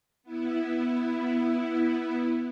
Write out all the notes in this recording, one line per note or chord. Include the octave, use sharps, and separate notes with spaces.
B3 E4